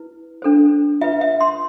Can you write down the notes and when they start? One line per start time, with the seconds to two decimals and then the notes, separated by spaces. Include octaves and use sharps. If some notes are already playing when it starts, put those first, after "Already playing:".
Already playing: E4 B4
0.42 D4 A4 C5
1.01 F4 B4 E5
1.21 E5
1.41 C6